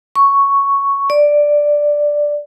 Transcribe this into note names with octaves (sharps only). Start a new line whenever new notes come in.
C#6
D5